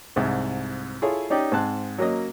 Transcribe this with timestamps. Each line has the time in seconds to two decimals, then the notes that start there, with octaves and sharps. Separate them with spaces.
0.16 C2 G#2
1.02 E4 F4 G#4 A4 C#5
1.30 C#4 D#4 G4 D5
1.52 G#2 C4 A5 F#6
1.98 F#3 A#3 C#4 D#5